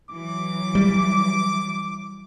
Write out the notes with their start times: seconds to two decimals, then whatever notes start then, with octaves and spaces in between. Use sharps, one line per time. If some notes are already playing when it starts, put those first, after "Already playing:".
0.10 E3 F#3 D6
0.75 G3